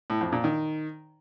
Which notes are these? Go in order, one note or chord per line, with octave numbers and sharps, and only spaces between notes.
A2
F2
A#2
D#3